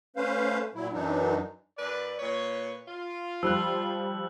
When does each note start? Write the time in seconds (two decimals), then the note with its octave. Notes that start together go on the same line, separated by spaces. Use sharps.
0.16 A3 C#4 B4 C5 F5
0.75 A#2 F#3 E4
0.93 F#2 E3 F#3 D4 D#4
1.77 F#2 B4 D5
2.18 A#2 B4 C#5
2.88 F4
3.43 F3 G3 E6 F#6